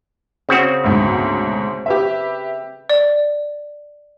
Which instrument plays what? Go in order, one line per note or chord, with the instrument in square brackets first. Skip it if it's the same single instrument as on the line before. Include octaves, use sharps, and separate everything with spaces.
[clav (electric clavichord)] C#3 C4 F#4
[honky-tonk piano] D2 G#2 B2
G4 B4 E5
[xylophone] D5